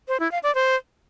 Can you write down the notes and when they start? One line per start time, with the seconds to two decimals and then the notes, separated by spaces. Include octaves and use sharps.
0.08 C5
0.20 E4
0.32 F5
0.43 D5
0.55 C5